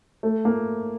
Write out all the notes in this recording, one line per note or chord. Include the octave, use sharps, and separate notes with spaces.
A3
A#3